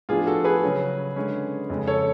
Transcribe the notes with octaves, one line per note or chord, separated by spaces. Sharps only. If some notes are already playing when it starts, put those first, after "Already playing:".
A2 F3 B3 D4 F4 G#4
F#4 A4
G#4 B4
C#3 F#3 C#4
D3 G#3 C#4
F2 C#3 G#3
A4 C#5